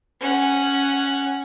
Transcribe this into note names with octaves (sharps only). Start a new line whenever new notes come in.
C#4 F#5